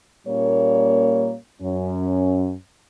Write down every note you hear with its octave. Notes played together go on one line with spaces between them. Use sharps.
A#2 G3 A#3 C#4 A#4 C#5
F#2 C#4